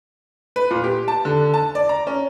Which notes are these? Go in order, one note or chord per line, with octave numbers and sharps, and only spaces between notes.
B4
A#2
G4
A5
D3
A5
D5
A#5
C#4